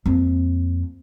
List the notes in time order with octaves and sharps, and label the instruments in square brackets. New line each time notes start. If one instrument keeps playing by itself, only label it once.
[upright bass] F2 A#3